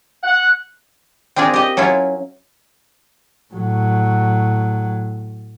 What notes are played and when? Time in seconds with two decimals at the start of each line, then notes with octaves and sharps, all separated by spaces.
0.24 F#5
1.36 C4 D4 F4 G#4 A#4
1.53 G4 D#5
1.77 F#3 C#4 E4 F4
3.54 A2 F#3